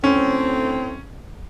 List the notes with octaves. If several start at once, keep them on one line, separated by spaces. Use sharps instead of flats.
D2 A2 C4 C#4